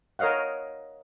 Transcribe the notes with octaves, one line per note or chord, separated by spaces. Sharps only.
A#4 C#5 D#5 F5 F#5